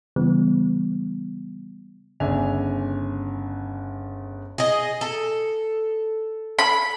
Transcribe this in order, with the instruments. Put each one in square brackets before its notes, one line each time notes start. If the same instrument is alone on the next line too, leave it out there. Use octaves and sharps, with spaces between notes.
[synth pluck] C#3 E3 G3 B3
[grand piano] G1 C#3 D4 E5 G#5 F7
[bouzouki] G#4 D#5
A4
[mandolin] B5